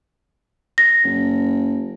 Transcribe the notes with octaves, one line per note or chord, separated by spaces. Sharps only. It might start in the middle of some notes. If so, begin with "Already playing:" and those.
A#6
F#1